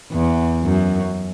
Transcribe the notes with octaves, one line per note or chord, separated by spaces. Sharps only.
E2
F#2